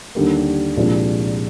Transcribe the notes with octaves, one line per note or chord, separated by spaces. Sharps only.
D#2 D3 G3 A#3
C2 A#2 F3 G#3 D4